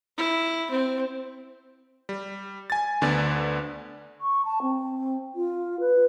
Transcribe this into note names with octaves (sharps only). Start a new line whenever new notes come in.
E4
C4
G3
G#5 A6
D2 D3 B3 D4 D5 A6
C#6
A5
C4
F4
B4